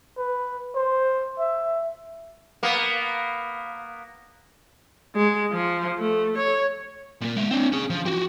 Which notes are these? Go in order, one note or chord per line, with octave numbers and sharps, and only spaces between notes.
B4
C5
E5
A#3 B3
G#3
F3
A3
C#5
A#2 A#3
G#3 E5
C4 D4
C#4 G#4
F3
F#4 G4